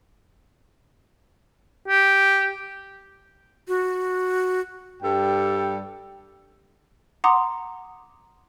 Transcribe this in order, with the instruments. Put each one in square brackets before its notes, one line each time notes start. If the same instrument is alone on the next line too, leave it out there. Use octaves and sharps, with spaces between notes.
[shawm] G4
[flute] F#4
[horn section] G2 G3 A4 G5
[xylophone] F#5 A#5 C6 D6 D#6